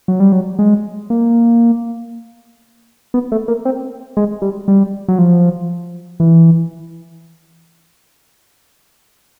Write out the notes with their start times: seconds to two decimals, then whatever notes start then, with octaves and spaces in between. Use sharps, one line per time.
0.08 F#3
0.20 G3
0.32 F#3
0.59 G#3
1.10 A#3
3.14 B3
3.32 A3
3.48 A#3
3.65 C4
4.17 G#3
4.42 G3
4.68 G3
5.08 F#3
5.19 F3
6.20 E3